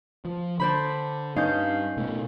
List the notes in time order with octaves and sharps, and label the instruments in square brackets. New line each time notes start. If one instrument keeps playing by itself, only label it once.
[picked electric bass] F3
[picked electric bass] D3 [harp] D4 C5 B5
[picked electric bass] G2 [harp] C#4 G6 [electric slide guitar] D#4 D#5 F5
[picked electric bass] B2 A3